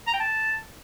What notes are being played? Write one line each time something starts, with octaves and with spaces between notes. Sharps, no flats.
A#5
G5
A5